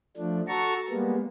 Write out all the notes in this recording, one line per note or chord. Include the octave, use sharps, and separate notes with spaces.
F3 A3 D4
F#4 A4 A5 A#5 C#6
G3 G#3 A#3 B3